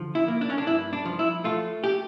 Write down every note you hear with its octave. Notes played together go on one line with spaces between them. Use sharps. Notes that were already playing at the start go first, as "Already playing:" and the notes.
Already playing: D3 F3
E4
A#3
D4
C#4
D4
G2 E4
D4
F3
E4
A3 F4
G4